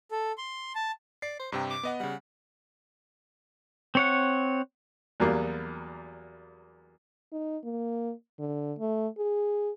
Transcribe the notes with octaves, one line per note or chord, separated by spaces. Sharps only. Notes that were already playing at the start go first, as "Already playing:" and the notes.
A4
C6
A5
D5 C7
C5
G2 C3 G5 A#5
D6
B3 D#5 F#5
C#3 G3 F#5
C4 C#5 F#5
E2 F#3 G3 A#3
D#4
A#3
D3
A3
G#4